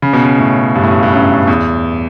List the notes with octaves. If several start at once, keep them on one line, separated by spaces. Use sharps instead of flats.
C#3
B2
C#3
A2
G2
A2
G2
G2
F#2
E2